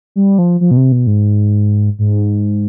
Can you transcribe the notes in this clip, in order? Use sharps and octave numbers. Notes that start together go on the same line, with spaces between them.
G3
F3
F3
B2
C3
B2
G#2
G#2